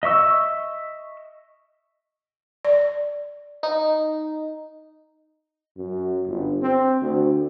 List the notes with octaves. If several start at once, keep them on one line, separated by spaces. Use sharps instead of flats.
D#5 E5 C#6 E6
D5
D#4
F#2
G1
C4
D2